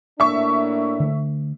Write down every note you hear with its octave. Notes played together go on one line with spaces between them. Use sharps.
A2 A#3 D4 E5 C#6
D3 A3